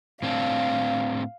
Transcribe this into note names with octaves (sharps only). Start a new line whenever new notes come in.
A2 C4 D4 F5